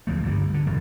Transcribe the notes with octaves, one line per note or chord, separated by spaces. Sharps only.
D2 F3 A3
G2 D3 D#3
D3
E1 F#2